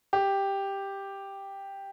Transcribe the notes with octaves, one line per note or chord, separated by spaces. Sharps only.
G4